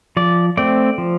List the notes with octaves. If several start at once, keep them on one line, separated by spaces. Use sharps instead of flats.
F3 D5
A3 C4 D5
F3